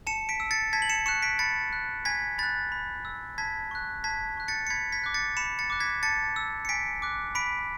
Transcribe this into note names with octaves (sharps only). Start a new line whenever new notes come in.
A5 C#7 E7
B6 D7
E6
A6 C#7
A5 G#6 B6
F#7
C#7 E7
C#6 F#6 C#7 E7
B6 D7
B5 A6 C#7
F#6
G#5 G#6 B6
B5 F#6 A6
B5
E6
A5 G#6 B6
C#6 F#6
A5 G#6 B6
C#6 F#6
A6 C#7
C#7
B5 G#6 B6
G#6 B6
D6 F#6
A6 C#7
B5 C#7 E7
A6 C#7
D6 F#6
G#6 B6
A5 A6 C#7
E6
C#7
G#5 B6 D7
D6 F#6
B5 B6 D7